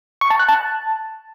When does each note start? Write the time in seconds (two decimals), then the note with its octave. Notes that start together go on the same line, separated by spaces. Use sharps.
0.21 C#6
0.30 A5
0.39 F#6
0.48 A5